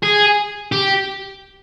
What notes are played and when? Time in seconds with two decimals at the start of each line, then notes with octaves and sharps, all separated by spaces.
0.03 G#4
0.72 G4